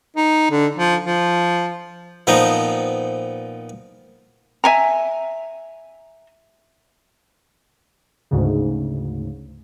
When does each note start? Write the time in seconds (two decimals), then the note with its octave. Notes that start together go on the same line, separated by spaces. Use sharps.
0.17 D#4
0.51 D3
0.76 F3
1.04 F3
2.27 A#2 F3 B3 C4 D#4
4.64 E5 G#5 A#5
8.31 D2 G#2 C#3